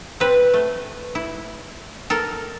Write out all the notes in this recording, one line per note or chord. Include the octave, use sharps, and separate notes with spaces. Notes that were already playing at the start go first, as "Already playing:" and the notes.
C4 B4
A3
E4
A4 A#4